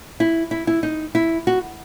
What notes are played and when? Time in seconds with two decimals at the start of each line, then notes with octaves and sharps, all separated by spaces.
0.20 E4
0.51 E4
0.67 E4
0.83 D#4
1.15 E4
1.47 F#4